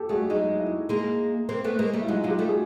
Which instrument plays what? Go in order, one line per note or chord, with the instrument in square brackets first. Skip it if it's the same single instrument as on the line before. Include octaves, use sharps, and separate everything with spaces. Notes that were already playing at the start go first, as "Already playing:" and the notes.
Already playing: [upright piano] G4 A4
[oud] G3 A3 [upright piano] F#4 G#4
[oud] F#3 G#3 [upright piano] D#4
[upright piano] E4
[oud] G#3 A#3
A#3 C4
A3 B3
G#3 A#3
G3 A3
[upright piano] E4
[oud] F#3 G#3 [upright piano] D#4 F4
[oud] F#3 G#3 [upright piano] F4 G4
[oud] G3 A3
[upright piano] F#4 G#4